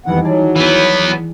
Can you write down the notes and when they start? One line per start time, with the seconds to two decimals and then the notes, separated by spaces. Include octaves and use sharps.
0.06 F2 D#3 E3 G3 B3 F#5
0.24 F#3 G#4 D5 A5
0.56 E3 B3